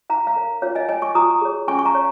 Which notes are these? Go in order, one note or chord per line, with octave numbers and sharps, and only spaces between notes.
D#4 F5 A#5
F5 A#5
A#4 C#5
F4 C#5 F5
D#5 G#5
C#5 D#5 G#5
G#5 C#6
F4 A#5 D#6
G#4 C#5
C#4 G#5 C#6
C#6
F5 A#5
C#5